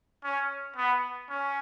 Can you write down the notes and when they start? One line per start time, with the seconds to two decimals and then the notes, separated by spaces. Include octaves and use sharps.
0.24 C#4
0.76 B3
1.30 C#4